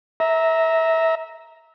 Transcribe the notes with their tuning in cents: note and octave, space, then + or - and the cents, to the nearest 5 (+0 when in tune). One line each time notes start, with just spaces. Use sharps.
E5 -20 A#5 +0